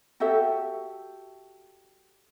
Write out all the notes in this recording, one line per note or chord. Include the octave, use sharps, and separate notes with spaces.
F#4 G4 A4 E5